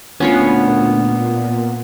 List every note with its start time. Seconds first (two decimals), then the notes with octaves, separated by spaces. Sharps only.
0.20 D2 A#2 B3 C#4 F4 C#5